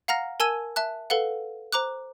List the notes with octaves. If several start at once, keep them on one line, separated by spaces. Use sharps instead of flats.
F5 F#5 A#5 F6 A#6
A#4 G#5 A5 E6 G#6 D#7
E5 A5 F#6
A4 B4 F5 F#5
C5 A#5 D6 F#6